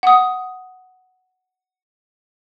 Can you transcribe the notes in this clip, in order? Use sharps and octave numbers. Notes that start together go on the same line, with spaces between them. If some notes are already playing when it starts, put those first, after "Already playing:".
F#5 D#6